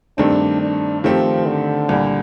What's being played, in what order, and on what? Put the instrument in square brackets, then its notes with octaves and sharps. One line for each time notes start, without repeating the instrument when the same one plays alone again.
[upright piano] G2 D#3 A3 C4 [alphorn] D4
[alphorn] D4
[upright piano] D#3 A3 C4 G4 [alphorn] F3
[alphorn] D3
[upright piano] C2 A#2 G3